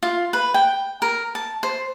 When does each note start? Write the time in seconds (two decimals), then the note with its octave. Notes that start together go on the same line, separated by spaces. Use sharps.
0.03 F4
0.33 B4
0.54 G5
1.02 A#4
1.35 A5
1.63 C5